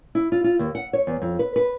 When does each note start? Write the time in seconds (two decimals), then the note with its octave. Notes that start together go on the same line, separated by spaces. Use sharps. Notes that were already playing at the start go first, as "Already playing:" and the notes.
0.15 E4
0.32 F4
0.44 F4
0.59 D#2
0.75 F#5
0.93 C#5
1.07 E2
1.22 F2
1.39 B4
1.56 B4